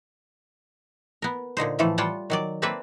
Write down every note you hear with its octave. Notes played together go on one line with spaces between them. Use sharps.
B3 A#4
A#2 D3 D#4 C5
A2 E3 F3 A3 A4
G3 F4 C#5 F#5 G5 A5
D#3 F#3 D5
A#3 C4 A4 B4 D5 E5